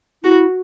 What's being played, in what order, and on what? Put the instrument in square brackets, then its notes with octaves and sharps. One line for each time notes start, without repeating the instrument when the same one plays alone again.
[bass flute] E4 [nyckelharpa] F#4